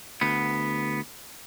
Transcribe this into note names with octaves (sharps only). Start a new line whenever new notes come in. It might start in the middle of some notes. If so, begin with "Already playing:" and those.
D2 B3